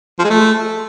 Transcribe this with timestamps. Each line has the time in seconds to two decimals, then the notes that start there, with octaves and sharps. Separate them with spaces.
0.19 F3
0.24 G#3
0.30 A3